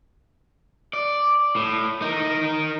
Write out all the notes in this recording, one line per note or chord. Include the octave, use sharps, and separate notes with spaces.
D5
A2
D#4 A#4